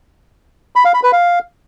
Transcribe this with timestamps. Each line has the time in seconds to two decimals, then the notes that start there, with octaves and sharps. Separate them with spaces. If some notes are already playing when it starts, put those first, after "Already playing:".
0.76 B5
0.85 F5
0.94 B5
1.03 B4
1.12 F5